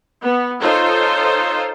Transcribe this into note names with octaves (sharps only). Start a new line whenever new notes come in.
B3
D#4 F4 A4 C5 C#5